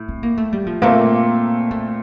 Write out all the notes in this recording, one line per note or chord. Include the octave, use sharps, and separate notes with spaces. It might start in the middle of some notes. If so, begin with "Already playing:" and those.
Already playing: A2
C4
A#3
A3
G3
F3
A#2 A3 A#3 C4
A3